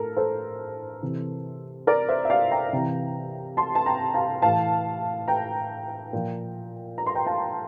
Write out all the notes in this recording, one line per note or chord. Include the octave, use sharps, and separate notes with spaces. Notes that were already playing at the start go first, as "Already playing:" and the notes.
Already playing: A2 A4 A#4
A4 C5
C3 E3
A#4 D5
C5 E5
E5
D5 F5
G5 A#5
C3 E3
A5 C6
A5
G5 A#5
F5 A5
A2 E3 F5 A5
G5 A#5
A#2 F3
A#5
C6
G5 A#5
F5 A5